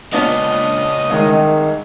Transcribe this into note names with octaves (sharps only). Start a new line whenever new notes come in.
C#2 A#2 B3 C#4 D4 D#5
C2 D#3 G#3